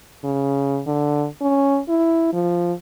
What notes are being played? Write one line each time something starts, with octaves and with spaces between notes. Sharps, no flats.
C#3
D3
C#4
E4
F3